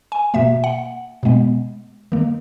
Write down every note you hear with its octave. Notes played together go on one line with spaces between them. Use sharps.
G#5
B2 A#3 E5
F#5
B2 G#3 B3
D#3 A#3